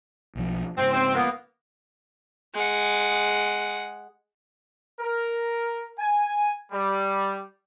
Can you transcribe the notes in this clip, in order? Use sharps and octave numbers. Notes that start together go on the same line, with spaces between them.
B1 F3
G#2 C#3 C4
C4
A#3 B3
G#3 F#5
A#4
G#5
G3